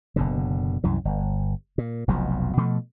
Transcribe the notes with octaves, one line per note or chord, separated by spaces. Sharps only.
F#1 B2 D3
C2 F#2 E3
G1
A#2
F1 B1 F2 B2
B2 F3 A3